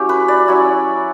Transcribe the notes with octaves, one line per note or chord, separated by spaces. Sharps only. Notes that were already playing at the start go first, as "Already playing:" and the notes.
Already playing: F#3 C#4 E4 G4
B4
D5
F#3 C#4 E4